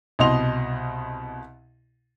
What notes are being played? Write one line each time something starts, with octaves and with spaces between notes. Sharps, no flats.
C2 B2 D#5 C6 F7